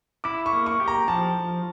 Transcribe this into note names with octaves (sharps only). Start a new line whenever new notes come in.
E4 D6
C#6
A#3
C#6
G4
A#5
F3 A5